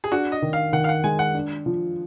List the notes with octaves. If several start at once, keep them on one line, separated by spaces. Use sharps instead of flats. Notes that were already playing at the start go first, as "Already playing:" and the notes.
G#4
D4 F#4
D#5
D#3
F5
D#3 F#5
F5
F#5
G#3 G#5
F#5
D4
F3